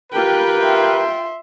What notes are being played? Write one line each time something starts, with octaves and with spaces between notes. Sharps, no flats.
F4 G4 A#4 B4 G5
E5 C6